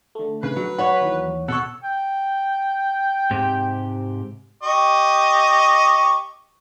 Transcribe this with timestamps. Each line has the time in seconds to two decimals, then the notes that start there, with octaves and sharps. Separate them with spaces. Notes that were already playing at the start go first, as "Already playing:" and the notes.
0.15 D3 A3
0.43 C#3 B4
0.56 F#3
0.78 C#5 F#5 B5
1.01 D#2 E3
1.48 B2 A4 C#5 F#5
1.84 G5
3.31 G#2 C3 G4
4.63 G4 D#5 C#6